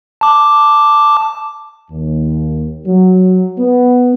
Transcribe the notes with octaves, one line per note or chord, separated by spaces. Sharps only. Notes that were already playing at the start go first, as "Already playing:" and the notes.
A5 D6
D#2
F#3
B3